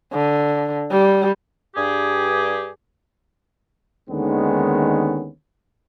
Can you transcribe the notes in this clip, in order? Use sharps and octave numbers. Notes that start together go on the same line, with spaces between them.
D3
G3
G2 G4 G#4
D#2 D3 D#3 G#3 B3 C#4